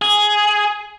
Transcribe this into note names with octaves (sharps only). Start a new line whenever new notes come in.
G#4